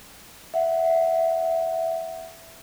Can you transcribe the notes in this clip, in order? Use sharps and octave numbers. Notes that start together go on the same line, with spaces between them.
E5 F#5